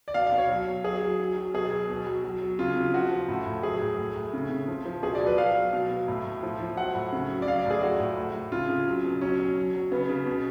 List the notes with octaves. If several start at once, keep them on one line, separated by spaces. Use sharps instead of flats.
D5
B2 F5
F5
B2
C#5
F#3
F#3
F#3 G#4
F#3
F#3
F#3
B2 G#4
F#3
B2
F#3
F#3
F#3
C#3 F4
C#3
F3 F#4
F3
A2
A2
F#3 G#4
A2
A2
A2
C#3
C#3
F3
F3
B2 G#4
D5
F#3
B4
F#3 F5
F#3
B2
B2
A2
A2
F3
F3
F#3 F#5
A2
C#3
F#3
D5
F#3 F5
D5
A2
G#4
F3 F#4
A2
A2
A2
C#3 F4
C#3
F#3
B2
F#3 C#4
F#3
F#3
F#3
C#3 B3
C#3
B2